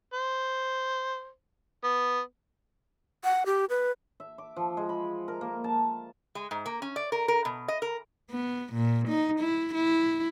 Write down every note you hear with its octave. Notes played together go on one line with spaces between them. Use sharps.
C5
B3
F#5
G4
B4
E5
D6
F3
G#3
B5
A#4
A#3
A5
G#3
G#2
A#3
C#4
D5
A#4
A#4
B2
D#5
A#4
B3
A#2
D#4
E4
E4